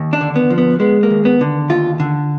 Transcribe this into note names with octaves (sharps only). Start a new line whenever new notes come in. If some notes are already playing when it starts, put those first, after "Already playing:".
Already playing: D#2
D4
D3
B3
F3
B3
G#3 B3
A#3
D#2
B3
D3
D#2 F4
D3